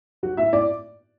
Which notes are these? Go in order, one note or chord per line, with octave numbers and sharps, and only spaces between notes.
F#3 F#4
A2 E5
A2 D5